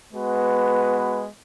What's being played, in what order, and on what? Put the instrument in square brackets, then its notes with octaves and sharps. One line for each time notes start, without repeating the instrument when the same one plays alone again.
[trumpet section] G#3 B3 F#4 B4